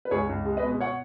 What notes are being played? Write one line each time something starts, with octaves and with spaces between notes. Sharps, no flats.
B4
C#2 G#4 C#5
C#2
G#3
B4 D#5
B2
C#5 F#5